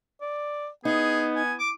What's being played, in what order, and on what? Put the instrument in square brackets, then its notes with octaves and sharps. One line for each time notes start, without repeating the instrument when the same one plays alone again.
[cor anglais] D5
[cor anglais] B3 [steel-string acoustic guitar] D#4 [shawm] G#4
[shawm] G#5
D6